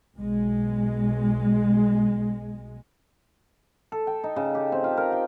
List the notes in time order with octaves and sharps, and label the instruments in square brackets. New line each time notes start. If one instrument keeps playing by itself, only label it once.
[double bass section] B1 G#3
[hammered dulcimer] A4
G5
D#4
C#3
G4
C4
F4
A#4
G5